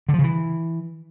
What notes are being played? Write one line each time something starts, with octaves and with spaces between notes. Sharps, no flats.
D3
F3
C#3
E3